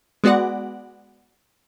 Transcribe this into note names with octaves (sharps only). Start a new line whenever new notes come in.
G#3 B3 F#4 D5 F#5